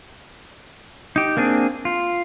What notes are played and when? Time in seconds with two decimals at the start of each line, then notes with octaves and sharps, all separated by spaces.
1.16 D#4 G4
1.37 A#3 C4 D4 G#4
1.85 F4